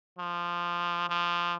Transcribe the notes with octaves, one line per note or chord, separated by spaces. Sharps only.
F3
F3